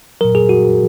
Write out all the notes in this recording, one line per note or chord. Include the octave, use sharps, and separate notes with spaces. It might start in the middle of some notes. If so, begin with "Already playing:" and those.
A#2 F#3 A#4
G#4
F#4